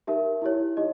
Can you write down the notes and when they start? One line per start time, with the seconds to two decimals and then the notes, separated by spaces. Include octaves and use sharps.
0.07 D#4 G4 A#4 E5
0.42 E4 G4 C#5
0.77 D#4 G4 D#5